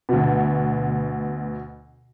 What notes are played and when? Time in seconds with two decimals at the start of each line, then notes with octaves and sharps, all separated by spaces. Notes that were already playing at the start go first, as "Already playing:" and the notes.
0.09 D2 B2